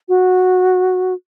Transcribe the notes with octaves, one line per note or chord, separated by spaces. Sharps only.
F#4